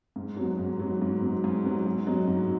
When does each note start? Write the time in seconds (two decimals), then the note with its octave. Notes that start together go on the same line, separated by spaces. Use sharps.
0.16 G#2
0.37 F#3 B3
0.59 G#2
0.79 F#3 B3
1.02 G#2
1.22 F#3 B3
1.44 G#2
1.65 F#3 B3
1.86 G#2
2.07 F#3 B3 D#4
2.28 G#2